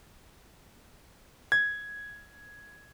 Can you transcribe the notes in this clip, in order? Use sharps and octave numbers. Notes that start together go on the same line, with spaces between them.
G#6